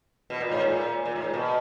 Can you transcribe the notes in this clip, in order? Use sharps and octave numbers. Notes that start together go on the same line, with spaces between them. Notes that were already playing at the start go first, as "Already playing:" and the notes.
B2
A#2
G#2
A#2
A#2
G#2
A#2
B2